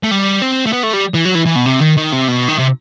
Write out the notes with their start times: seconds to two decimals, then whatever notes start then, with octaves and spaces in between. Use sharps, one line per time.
0.03 A3
0.11 G3
0.42 C4
0.66 A3
0.73 B3
0.83 A3
0.93 G3
1.14 E3
1.25 F#3
1.35 E3
1.46 E3
1.55 B2
1.66 C3
1.81 D#3
1.97 D#3
2.13 C3
2.28 B2
2.49 D#3
2.59 C3